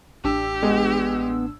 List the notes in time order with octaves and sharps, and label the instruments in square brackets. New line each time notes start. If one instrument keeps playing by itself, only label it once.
[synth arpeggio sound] A1 D4 E6 [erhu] G4
[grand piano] G#3 [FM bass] B3